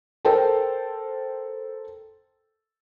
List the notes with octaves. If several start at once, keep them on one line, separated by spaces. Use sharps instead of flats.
A4 A#4 C5 G5 A5